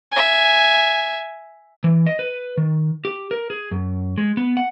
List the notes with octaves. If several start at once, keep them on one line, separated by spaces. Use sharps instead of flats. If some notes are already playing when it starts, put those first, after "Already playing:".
E5 G#5
E3
D#5
B4
D#3
G4
A#4
G#4
F#2
G#3
B3
F#5